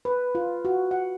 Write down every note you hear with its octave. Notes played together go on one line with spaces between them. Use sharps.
B4
F4
F#4
F#5